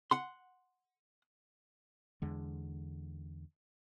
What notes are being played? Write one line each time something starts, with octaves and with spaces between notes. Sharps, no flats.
F#5 C6
E2 D3 G#3